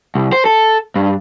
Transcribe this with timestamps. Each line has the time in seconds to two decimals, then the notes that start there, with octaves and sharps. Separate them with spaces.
0.15 C2
0.33 C5
0.45 A4
0.96 G2